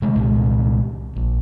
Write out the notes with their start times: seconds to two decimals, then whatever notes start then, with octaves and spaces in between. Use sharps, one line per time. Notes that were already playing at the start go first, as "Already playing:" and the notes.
0.02 C3 D#3 G#3 A3
0.16 C2 A#2 G#3
1.16 A#1